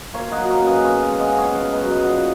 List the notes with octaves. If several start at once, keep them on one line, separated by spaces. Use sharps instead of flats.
A#3 C#5 F5
D#5 F#5
F#3
C#5 F5
C#3
B4 D#5
B3 C#5 F5
G#3
D#5 F#5
C#3
C#5 F5
B3 C#5 F5
B4 D#5
F#3
B4 D#5
A#2 C#5 F5 F#5